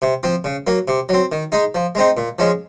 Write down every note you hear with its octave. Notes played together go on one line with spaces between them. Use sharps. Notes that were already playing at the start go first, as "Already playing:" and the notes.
C3
F3 C4
C#3
F#3 A#3
C3
F#3 C4
D#3
G#3 D#4
F3
G#3 C4 D#4
A#2
F3 G#3 C#4